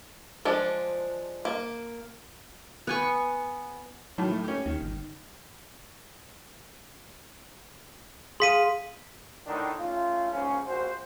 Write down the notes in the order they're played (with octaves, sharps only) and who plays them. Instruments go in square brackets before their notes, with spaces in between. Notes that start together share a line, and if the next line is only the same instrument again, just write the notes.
[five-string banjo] F3 G#3 D4
A#3
[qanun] B3 G#5 C#6
[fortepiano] A2 D#3 A5 [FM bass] F#3
[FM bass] A3
[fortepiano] C#4 G4
[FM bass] D#2 [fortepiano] D#3
[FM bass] G1
[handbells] G#4 F5 [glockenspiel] C6 B6 D#7
[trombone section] A2 D3 D#3 D4 D#4
C#3 A3 F4
A#1 G#2 C#3 C#4
A#1 F#4 C5